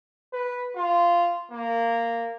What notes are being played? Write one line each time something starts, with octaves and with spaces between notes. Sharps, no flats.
B4
F4
A#3